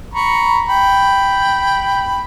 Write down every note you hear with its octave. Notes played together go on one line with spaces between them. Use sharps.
A#5 B5 C#6
G5 B5